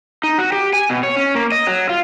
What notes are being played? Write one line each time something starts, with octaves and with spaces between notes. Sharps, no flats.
D#4
F#4
G4
G#5
B2
C#5
C#4
A#3
D#5
F#3
F4